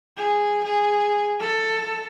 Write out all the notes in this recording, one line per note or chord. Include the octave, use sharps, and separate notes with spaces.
G#4
G#4
A4